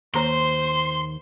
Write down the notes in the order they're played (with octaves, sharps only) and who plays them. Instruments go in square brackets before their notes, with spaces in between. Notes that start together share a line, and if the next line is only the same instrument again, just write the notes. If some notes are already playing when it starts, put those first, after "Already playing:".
[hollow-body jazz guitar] D#2 A#5 [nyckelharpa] C5 [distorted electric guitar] C6